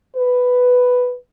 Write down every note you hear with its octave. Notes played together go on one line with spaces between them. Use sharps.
B4